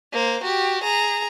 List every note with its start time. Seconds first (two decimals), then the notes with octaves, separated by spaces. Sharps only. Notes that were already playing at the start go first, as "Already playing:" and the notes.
0.13 A#3 C5
0.44 F#4 G4
0.83 G#4 A#5